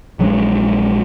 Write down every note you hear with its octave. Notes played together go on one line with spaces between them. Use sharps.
A#1 F#3 G#3 D4